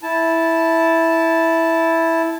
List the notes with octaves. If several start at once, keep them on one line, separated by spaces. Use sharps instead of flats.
E4 A5